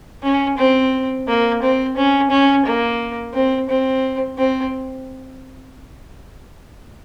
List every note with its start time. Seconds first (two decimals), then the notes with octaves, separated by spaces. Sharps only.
0.23 C#4
0.57 C4
1.28 A#3
1.62 C4
1.97 C#4
2.31 C#4
2.66 A#3
3.34 C4
3.70 C4
4.38 C4